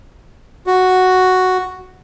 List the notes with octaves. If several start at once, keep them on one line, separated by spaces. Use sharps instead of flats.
F#4